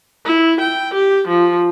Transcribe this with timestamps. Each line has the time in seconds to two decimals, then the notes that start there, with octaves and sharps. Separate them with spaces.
0.25 E4
0.60 G5
0.94 G4
1.28 F3